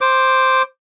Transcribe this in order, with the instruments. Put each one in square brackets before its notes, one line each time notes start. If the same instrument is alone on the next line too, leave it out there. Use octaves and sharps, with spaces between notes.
[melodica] C5 D6